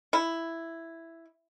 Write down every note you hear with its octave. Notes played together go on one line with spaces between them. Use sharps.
E4